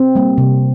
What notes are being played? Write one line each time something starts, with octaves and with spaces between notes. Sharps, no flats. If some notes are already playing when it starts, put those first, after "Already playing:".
Already playing: C4
G3 A#3
C3